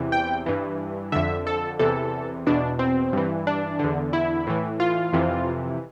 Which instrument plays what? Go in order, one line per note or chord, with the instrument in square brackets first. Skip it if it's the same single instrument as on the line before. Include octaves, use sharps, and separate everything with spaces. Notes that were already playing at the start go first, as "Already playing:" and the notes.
Already playing: [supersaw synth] E2 C3 E3
G5
G2 E3
F2 D3 E5
A4
E2 C3 E3 A4
E2 B2 D4
C4
G2 E3
D4
E2 D3
E4
A2 E3
F4
F2 C3 E3